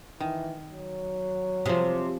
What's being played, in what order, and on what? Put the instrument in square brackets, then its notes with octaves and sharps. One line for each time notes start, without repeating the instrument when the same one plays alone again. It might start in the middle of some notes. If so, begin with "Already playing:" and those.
[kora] D#3 [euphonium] E3
[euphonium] F#3
[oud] C3 [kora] F3 G#4